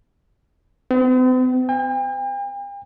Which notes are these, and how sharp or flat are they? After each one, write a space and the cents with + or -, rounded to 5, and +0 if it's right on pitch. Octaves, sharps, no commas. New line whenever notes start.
C4 -45
G5 +45